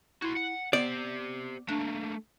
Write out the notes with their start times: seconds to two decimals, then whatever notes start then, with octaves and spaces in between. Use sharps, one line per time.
0.22 E4 F#4 C6
0.36 F#5
0.73 B3 G4 C5 D5
1.69 A3 A#3 D4